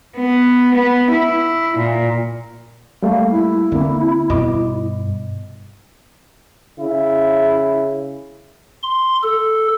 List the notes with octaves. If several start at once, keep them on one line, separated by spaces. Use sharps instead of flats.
B3
B3
E4
A#2
G3 A3 A#3 F5
E4
D3 A#3 C4
G2 B2 D#5 D6
C#3 E4
C6
A4